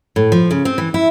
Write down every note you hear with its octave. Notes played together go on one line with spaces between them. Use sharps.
A2
F3
C#3
C4
E3
E4